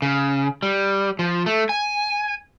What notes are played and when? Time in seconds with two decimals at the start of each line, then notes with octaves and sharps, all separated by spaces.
0.02 C#3
0.63 G3
1.19 F3
1.46 A3
1.69 G#5